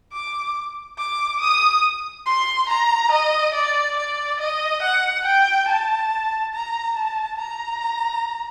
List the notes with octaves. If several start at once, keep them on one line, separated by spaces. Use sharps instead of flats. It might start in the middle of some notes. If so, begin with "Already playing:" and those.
D6
D6
D#6
C6
A#5
D#5
D5
D5
D#5
F#5
G5
A5
A#5
A5
A#5